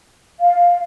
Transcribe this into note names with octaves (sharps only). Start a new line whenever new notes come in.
F5